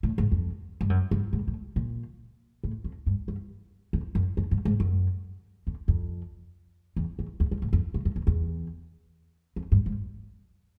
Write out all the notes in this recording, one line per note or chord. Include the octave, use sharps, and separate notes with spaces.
A2
G#2
F2
G2
F#2
G2
G#2
A2
A#2
A2
F2
G2
G2
F2
F#2
F#2
G2
G#2
F#2
F2
F2
E2
E2
E2
F#2
G#2
F2
G2
F#2
F2
E2
F2
G2
G#2